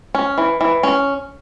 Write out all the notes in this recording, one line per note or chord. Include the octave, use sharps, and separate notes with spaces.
C#4
E3
E3
C#4